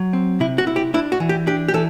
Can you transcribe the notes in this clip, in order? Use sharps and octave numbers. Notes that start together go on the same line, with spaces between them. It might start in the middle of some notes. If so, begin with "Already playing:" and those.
Already playing: F#3
C4
C3 E4
F#4
E4
G4
D4 E4
F#4
E3
G4
D4 G4
G4
E3 A4